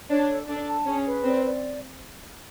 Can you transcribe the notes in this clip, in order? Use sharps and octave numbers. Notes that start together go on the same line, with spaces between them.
D4 C#5
A4
D4 A4
A5
C#4 G#4
B4
C4 D5
D5